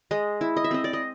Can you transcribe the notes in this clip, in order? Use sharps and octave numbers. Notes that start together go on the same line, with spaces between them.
G#3 D#5
E4
D#5
E5
C4 D#5
D5
D#5